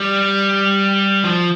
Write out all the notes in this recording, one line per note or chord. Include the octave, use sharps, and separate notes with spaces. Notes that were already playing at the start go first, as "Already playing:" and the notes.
Already playing: G3
F3